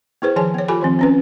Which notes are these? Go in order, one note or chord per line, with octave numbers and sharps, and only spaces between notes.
B3 E4 G#4 B4 C5
D#3 F3 G#4 C#5 G#5 A5
B3 C#5
F4 G4 A4 C#5 G#5 B5
D#3 F3 C4
C4 C#4 B4